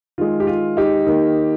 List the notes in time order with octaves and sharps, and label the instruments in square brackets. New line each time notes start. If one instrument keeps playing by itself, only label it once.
[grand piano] D#3 G#3 F4
G4
F4
D#4 G4
D#3 A#3